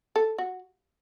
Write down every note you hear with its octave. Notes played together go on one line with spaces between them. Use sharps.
A4
F#4